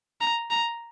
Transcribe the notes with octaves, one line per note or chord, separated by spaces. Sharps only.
A#5
A#5